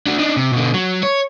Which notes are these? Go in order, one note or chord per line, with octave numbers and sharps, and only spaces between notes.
D4 F#4
D4 D#4
C3
B2 D3
F#3
C#5